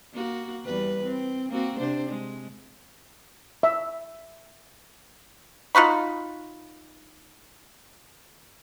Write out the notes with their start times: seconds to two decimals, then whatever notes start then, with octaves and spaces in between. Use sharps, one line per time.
0.14 A#3 F#4
0.65 E2 G3 B4
1.04 C4
1.50 A#3 C4 F#4
1.79 C3 D4 C5
2.09 G#3
3.63 E5
5.75 D#4 F4 F#4 B5